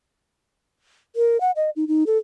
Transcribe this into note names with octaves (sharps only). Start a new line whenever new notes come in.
A#4
F#5
D#5
D#4
D#4
A4